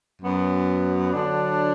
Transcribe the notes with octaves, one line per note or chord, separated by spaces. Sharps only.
F#2 F#3 B3
D3 F#3 D4